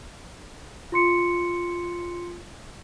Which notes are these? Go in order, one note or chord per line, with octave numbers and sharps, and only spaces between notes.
F4 C6 C#7